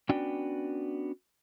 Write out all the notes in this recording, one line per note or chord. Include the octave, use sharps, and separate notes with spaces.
B3 C#4 D4 F#4 D5 G5